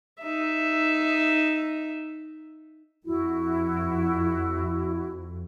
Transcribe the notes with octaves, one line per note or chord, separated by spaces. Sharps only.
D#4 E5
F2 E4 F#4